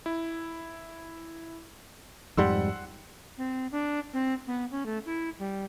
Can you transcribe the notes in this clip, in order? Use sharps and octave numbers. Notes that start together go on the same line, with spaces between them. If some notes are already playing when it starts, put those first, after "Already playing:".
E4
F2 G#2 G3 F#5 C6 E6
C4
D4
C4
B3
C#4
A3
E4
G3